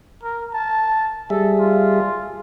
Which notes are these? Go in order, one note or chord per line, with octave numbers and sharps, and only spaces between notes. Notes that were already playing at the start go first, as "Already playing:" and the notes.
A#4
A5
G3 G#4 A4 E5
F4